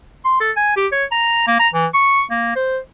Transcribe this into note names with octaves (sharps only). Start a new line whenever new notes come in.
C6
A4
G#5
G4
C#5
A#5
A#3
A#5
E3
C#6
A#3
C5